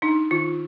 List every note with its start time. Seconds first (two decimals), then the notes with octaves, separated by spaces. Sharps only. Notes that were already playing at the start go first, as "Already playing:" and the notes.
0.02 D4 D#4
0.31 D#3 F4